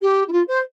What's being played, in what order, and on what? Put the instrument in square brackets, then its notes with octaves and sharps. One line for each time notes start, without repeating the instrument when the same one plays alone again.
[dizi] G4
E4
F4
C5